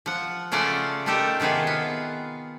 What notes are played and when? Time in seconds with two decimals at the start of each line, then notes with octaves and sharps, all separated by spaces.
0.06 F3 F#5
0.52 C#3 A3 C#4 F4 D5 F#5
1.06 A3 D#4 F4 G4 A4 A#4
1.40 C3 D#3 B3 F4 G#4
1.67 B3